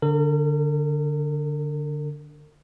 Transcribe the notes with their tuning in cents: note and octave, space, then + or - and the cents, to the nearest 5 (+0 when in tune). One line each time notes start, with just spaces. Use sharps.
D3 +0 A#4 -40